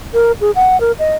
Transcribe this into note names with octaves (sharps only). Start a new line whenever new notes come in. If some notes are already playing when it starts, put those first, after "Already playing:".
A#4
G#4
F#5
A#4
D#5